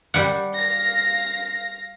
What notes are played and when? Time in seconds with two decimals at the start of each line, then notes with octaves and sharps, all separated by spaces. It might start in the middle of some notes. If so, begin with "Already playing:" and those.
0.14 G3 F#5
0.55 F5 A#6